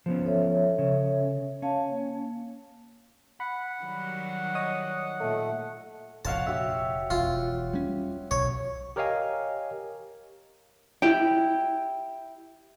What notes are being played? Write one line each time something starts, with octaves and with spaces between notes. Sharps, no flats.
F3 B3 C#4 C5
A4 C#5 E5
C#3
C#4 C#5 F5 A5
A#3
F#5 B5
D#3 F#3 G3
C#5 D#5 D#6
A#2 A3
F1 A#2 C#5 F5 F#5 A5
F#4 G4 E5
E1 F4
G3 C#4
B1 C#5
G4 A#4 C#5 D#5 F5 G#5
E4 G4 G5